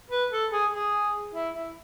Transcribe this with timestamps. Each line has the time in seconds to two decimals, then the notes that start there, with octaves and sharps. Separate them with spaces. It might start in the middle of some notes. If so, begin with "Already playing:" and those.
0.10 B4
0.31 A4
0.51 G#4
0.72 G#4
1.34 E4
1.55 E4